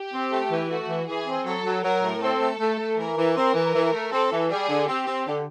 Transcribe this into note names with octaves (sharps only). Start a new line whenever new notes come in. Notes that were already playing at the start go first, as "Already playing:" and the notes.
Already playing: G4
C4
A3
E3
A3 F#4
E3
E3 G#4
C4
F#3 A4
F#3
F#3 A#4
A2
C4 A4
A3
A3
A3
E3 A#4
E3
C4 A#4
E3
E3
A3
C4 A4
E3
G3 G#4
D3
C4 G4
C4
D3